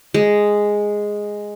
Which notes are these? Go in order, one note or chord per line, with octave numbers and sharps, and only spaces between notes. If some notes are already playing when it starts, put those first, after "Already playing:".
G#3